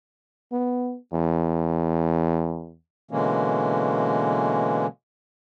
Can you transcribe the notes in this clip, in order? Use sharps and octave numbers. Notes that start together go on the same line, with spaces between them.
B3
E2
B2 D3 E3 G#3 A#3 C#4